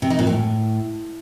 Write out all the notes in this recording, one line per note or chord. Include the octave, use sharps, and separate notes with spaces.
C3
D#4
A#2
A2